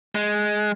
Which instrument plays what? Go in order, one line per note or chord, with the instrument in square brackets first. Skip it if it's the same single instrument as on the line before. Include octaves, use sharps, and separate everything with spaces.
[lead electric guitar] G#3